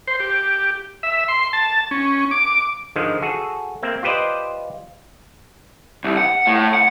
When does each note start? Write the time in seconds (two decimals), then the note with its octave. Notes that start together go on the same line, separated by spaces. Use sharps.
0.07 C5
0.20 G4
1.03 E5
1.28 C6
1.53 A5
1.91 C#4
2.31 D6
2.96 G#2 D3 D#3 F3 G#3
3.22 F#4 G#4 A4
3.83 A#3 C4 E5
4.03 F4 G4 B4 C5 D5 D#5
6.04 C2
6.17 F#5
6.47 A2
6.74 F#5